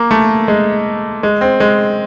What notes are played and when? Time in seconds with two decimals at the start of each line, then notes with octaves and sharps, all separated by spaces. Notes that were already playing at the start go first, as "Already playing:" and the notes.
Already playing: A#3
0.11 A3
0.48 G#3
1.23 G#3
1.41 C4
1.60 G#3